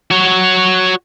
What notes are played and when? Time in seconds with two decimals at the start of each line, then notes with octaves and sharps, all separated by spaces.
0.11 F#4 C#5